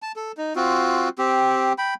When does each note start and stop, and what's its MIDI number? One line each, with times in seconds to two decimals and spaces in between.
0.02 0.12 81
0.16 0.32 69
0.37 0.53 63
0.56 1.09 60
0.56 1.09 65
0.56 1.09 66
1.18 1.73 60
1.18 1.73 67
1.78 1.94 79
1.78 1.94 83